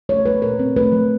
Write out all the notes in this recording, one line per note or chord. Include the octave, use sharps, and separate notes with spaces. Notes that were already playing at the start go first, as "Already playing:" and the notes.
A3 C#5
F#3 B4
A#2 A#4
C4
A3 B4
F#3